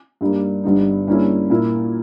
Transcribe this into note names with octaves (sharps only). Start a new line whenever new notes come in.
G2 G3 A#3 D#4
G1 G2 G3 B3 D#4
G2 G3 A#3 C#4 E4
A#2 A#3 E4